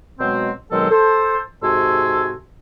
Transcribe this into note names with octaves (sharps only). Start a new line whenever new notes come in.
B2 F#3 G#3 C4
B2 D#3 F#3 G#3 C4 A4
A4 C5
G#2 C3 F#4 A4 G#5 C6